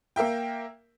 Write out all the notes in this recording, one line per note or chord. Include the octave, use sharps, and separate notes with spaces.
A#3 A#4 E5 G5